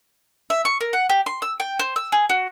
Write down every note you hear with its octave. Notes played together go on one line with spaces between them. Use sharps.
E5
C#6
A#4
F#5
G4
C6
E6
G5
C5
E6
G#4
F#4